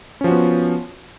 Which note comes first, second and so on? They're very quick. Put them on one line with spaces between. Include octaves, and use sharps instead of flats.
C#4 F3 F#4 B3